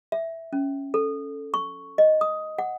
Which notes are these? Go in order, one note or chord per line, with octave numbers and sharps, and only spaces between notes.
E5
C#4
A4
C#6
D#5
D#6
F#5